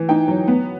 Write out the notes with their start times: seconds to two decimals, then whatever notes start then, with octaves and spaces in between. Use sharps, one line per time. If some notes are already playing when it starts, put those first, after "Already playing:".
Already playing: E3
0.09 D#4 G5
0.28 F#3
0.48 B3